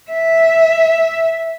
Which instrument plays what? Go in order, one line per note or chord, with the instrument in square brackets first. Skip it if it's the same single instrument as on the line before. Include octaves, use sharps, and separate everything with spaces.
[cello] E5